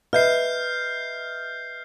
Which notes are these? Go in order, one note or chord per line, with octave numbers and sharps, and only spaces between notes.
B4 D#5 E5 F6 G6 C7